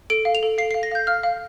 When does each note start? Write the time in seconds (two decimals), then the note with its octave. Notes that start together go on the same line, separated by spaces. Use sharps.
0.10 A4 D7
0.25 F5
0.35 F7
0.43 A4
0.58 F5 C7
0.71 C7
0.74 F5
0.83 A#6
0.91 F5 G6
1.07 F5 F6
1.23 F5